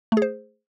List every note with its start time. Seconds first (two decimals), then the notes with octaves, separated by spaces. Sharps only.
0.12 A3
0.17 G#4
0.22 C5